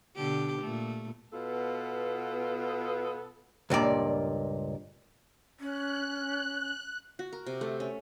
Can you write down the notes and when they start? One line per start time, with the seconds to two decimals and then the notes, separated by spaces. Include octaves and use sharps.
0.16 B2 D3 G4
0.61 A#2 A3
1.32 B2 B3 F4 A4
3.70 C#2 G2 A#2 D5
5.60 C#4 F#6
7.19 F#4
7.33 A#4
7.46 C3
7.61 A3
7.80 C#4